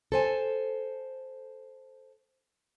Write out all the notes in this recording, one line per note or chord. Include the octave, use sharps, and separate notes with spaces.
A4 C5 G#5